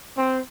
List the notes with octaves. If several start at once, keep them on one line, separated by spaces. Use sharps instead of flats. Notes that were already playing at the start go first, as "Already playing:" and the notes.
C4